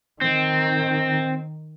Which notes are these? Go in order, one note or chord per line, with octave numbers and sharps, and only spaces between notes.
D#3 C4